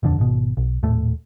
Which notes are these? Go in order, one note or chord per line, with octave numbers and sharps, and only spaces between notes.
D#1 F2 D3 D4
G#1 B2
B1
D#1 A2 A3